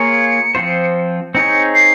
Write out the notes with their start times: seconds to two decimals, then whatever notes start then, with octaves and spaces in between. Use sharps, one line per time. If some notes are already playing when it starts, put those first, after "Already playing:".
Already playing: A#3 F4 G#4 C#5 C#7
0.55 F3 C4 F4 C5
1.34 C4 D#4 G#4 C#5 C#7
1.74 C7